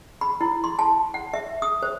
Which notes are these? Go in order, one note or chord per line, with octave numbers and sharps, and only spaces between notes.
B5
E4
C6
A5
F#5
E5
D#6
C5